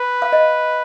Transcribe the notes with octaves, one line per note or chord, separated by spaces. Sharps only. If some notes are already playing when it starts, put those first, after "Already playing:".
Already playing: B4
F5
D#5